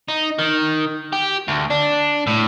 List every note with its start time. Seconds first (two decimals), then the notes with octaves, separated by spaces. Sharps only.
0.08 D#4
0.39 D#3
1.13 G4
1.48 D2
1.71 D4
2.27 A2